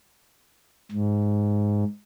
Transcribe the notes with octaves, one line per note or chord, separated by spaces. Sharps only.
G#2